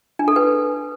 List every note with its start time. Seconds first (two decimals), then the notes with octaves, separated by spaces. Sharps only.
0.19 D4
0.28 A4
0.36 B4